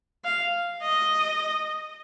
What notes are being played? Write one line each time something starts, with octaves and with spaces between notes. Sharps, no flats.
F5
D#5